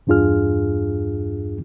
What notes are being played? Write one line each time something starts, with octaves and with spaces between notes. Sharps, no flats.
E2 G2 D4 F4 G#4 F6